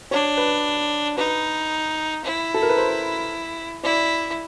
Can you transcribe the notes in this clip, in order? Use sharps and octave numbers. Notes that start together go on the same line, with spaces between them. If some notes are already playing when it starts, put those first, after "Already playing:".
D4 C#5
B4
D#4 B4
E4
A4
A#4
B4
C5
E4 D5